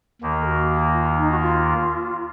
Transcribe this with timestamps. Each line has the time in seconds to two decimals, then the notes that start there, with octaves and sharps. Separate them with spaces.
0.22 D#2 D#3 A#3
0.41 A4
0.46 F#4
0.93 F4
1.16 D#4
1.31 F#4
1.40 F4